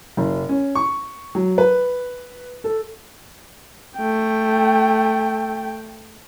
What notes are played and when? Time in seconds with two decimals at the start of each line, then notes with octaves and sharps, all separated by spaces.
0.17 F#1
0.49 C#4
0.75 C#6
1.35 F#3
1.58 B4
2.64 A4
3.97 A3 G5